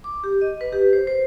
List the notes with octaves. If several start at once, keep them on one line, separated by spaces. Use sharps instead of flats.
D6
G4
D#5
B4
G4
C5
C5